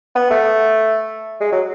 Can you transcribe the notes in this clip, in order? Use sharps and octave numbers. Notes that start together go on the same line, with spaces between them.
B3
A3
G#3
F#3